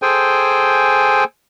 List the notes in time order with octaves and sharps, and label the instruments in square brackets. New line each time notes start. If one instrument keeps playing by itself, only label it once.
[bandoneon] G#4 A4 C5 G5 G#5